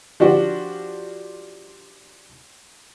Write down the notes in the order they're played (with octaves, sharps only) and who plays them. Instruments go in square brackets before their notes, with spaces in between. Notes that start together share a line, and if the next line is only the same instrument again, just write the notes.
[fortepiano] F3 D4 F#4 G4